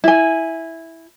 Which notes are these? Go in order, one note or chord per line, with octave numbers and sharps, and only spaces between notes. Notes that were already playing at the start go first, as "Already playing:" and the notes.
E4 G#5